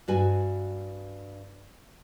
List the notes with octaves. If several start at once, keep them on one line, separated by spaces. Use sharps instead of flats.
G2 F#4 G#5